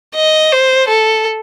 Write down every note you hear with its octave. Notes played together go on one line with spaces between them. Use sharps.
D#5
C5
A4